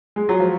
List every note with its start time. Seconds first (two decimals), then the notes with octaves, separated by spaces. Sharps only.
0.16 G#3
0.29 F#3
0.40 F3